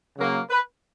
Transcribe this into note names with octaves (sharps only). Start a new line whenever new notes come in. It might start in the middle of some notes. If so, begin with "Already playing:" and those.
C#3 F#3 A#3
B4